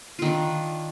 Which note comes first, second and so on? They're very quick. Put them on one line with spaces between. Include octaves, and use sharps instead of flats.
F4 D#3 D4